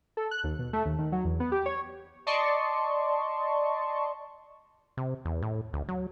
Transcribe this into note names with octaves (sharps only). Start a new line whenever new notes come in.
A4
F#6
D#2
B2
A3
D#2
D#3
F#3
E2
B3
G4
C#5
D5 D#5 A5 C6 C#6
C3
E2
A2
D2
F#3